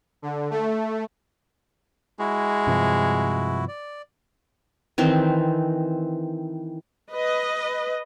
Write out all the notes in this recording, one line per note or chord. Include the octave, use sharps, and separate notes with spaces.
D3
A3
G#3 E4 F#4
G2 C3 F3
D5
D#3 E3 C4
B4 D#5